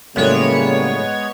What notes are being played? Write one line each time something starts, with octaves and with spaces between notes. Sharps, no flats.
F#2 A2 C#3 G3 G#3 A#3 B3 C#5